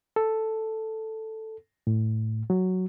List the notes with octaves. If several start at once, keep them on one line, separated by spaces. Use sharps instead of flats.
A4
A2
F#3